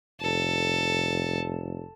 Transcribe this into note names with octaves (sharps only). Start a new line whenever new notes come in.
F1 A4